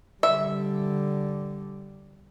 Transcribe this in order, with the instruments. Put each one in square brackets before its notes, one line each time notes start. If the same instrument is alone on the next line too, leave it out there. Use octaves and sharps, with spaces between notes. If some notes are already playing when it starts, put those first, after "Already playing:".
[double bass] D3 G3 [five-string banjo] E5